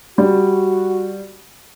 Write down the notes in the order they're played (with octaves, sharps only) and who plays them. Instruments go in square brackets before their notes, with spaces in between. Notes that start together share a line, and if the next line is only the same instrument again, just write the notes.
[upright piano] G3 [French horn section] F#4